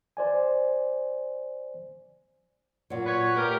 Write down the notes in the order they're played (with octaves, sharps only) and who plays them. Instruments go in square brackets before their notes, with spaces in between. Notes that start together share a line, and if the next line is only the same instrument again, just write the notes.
[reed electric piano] C5 D5 G#5
[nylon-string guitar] A#2 F#3
[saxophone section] B4 C#5
[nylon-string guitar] A3 [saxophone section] G4 A#4